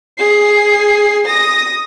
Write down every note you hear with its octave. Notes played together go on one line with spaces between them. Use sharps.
G#4 C7
D#6 A#6